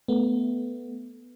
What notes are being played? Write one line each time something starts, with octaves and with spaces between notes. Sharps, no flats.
A3 B3